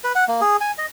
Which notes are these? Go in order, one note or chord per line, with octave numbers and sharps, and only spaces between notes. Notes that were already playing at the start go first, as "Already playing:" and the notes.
B4
F#5
A#3
G#4
G#5
D#5